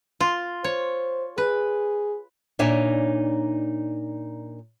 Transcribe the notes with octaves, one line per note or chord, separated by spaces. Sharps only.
F4
C5 C#5
G#4 B4
A#2 D4 D#4 C#5 E5 G#5